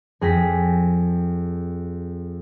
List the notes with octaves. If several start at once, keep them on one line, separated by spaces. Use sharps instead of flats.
F2 G#4 G5 A#6 B6